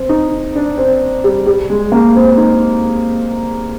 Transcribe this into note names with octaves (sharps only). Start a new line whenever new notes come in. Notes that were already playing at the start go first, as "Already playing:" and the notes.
Already playing: C4
D#4
D4
C4
G3
G3
G#3
A#3
C4
D#4